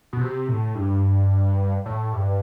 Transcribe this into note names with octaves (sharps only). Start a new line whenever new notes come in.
B2
C3
A2
G2
A2
G2